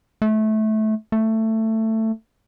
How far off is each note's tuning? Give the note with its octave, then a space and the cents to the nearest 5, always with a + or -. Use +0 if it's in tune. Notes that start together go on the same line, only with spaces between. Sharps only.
A3 -20
A3 +15